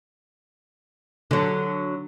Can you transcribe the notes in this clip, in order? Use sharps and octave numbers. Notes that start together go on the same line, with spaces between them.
D3 F#3